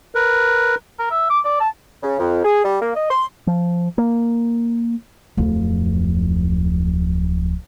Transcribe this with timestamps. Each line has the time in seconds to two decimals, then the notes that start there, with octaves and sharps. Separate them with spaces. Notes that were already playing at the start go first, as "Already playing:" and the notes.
0.15 A#4 B4
0.99 A#4
1.11 E5
1.30 D6
1.45 D5
1.60 A5
2.03 C#3
2.19 F2
2.43 G#4
2.64 G3
2.81 A#3
2.94 D#5
3.10 C6
3.47 F3
3.98 A#3
5.37 D1 F2